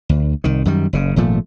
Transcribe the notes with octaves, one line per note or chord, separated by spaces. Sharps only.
D2
C2 D#3
F#2 D#3 G3
F#1 C#3
G#1 A#2 F3 A3